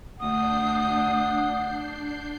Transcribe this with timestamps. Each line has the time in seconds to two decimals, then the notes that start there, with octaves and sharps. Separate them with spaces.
0.20 D2 D4 F#5 D#6 G6 C7